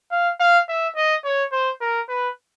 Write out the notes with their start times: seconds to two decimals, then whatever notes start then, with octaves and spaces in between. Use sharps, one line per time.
0.11 F5
0.40 F5
0.68 E5
0.96 D#5
1.24 C#5
1.52 C5
1.81 A#4
2.09 B4